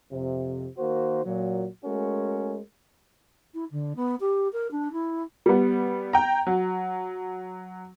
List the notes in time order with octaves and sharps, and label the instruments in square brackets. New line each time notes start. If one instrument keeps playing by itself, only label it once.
[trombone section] F2 C3
D#3 A#3 F#4 C5
A#2 F#3
G#3 A3 C#4 F#4 A#4
[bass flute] E4
D3
B3
G4
A#4
D4
E4
[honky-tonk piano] G3 B3
G5 A#5
F#3